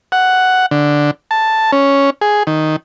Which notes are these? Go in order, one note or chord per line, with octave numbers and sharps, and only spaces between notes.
F#5
D3
A5
C#4
G#4
D#3